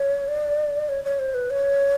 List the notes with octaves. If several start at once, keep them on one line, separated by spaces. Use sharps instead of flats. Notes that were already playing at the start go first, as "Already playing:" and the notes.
Already playing: C#5
D5
C#5
C#5
C5
B4
C#5